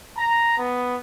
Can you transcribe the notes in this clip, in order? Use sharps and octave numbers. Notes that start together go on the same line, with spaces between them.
A#5
B3